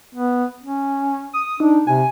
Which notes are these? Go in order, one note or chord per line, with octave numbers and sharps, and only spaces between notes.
B3
C#4
D#6
D4 D#4
C3 G#5